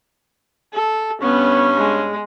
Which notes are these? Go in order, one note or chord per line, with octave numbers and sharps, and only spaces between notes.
A4
G2 B3 C#4
G#3